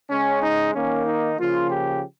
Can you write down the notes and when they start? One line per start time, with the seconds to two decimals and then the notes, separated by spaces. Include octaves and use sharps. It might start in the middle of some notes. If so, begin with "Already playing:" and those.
0.09 C#3 G#3 C#4
0.42 D#4
0.74 D#3 A#3 C#4
1.06 D#4
1.38 C#3 F3 A#3 F4
1.70 G4